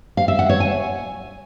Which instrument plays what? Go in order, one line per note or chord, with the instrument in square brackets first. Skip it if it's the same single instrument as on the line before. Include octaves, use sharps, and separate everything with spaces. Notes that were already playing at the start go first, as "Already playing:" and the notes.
[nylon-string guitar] F5
E5
F#5
C#5
G#5